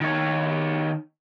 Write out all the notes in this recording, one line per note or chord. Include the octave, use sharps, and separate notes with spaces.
D#3 C#5